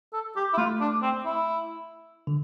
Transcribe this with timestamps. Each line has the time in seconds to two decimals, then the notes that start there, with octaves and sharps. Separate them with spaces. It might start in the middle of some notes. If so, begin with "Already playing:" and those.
0.13 A4
0.36 G4
0.53 E4
0.57 A3 F4
0.81 D4
1.02 C4
1.25 E4
2.27 D3